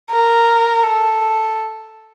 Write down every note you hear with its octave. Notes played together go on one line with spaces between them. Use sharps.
A#4
A4